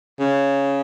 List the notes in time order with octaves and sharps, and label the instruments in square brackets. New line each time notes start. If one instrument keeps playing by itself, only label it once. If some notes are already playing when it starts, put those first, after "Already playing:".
[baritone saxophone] C#3